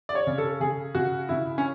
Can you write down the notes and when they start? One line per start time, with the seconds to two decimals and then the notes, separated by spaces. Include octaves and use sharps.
0.09 D5
0.15 C#5
0.27 C#3
0.38 A4
0.60 C#3 G#4
0.95 C#3 F#4
1.29 C#3 E4
1.58 C#4